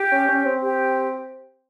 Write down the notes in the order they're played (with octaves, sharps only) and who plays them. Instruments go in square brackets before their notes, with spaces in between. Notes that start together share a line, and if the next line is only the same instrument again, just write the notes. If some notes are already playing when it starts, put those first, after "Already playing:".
Already playing: [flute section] G4
[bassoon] C#4
C#4
C4
[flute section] G4